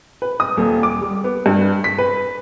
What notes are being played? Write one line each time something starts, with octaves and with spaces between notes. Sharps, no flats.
B4
D#6
D#1
D6
G3
B3
G2
B6
B4